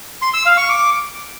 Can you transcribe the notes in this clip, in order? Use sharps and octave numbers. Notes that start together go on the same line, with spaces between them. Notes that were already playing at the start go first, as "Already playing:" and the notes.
C6
E6
F5
C#6
D6